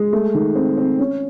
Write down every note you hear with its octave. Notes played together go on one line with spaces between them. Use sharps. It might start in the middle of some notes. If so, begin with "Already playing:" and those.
Already playing: G#3
A3
D#3
C4
C4
C#4